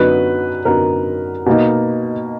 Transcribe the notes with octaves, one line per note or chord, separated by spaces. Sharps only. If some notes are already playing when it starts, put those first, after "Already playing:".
Already playing: F#2 D3 F#3 B3 D#4 B4
F#2 D3 F#3 B3 D#4 A#4
B2 A#3 D#4